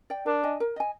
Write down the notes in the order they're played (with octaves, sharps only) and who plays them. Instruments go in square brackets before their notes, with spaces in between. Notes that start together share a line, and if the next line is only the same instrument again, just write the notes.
[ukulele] D5 G5
[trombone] D4 [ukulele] A#4
[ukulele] D#5 G#5
A#4
D#5 G#5